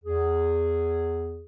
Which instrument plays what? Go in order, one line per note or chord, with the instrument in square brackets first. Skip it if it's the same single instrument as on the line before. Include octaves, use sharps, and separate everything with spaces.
[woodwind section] E2 G#4